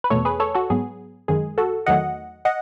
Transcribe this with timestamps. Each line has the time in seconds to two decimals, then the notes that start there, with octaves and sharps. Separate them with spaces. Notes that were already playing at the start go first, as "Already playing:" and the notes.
0.04 B4
0.10 E2 B2 A3 A4 C#5
0.25 G#4 B4
0.40 A4 C#5
0.55 F#4 A4
0.70 G#2 F#3 B3 G#4
1.28 F#2 D#3 G#3 G#4
1.58 F#4 A4
1.86 E2 D#3 F#3 A3 D#5 F#5
2.45 D#5 F#5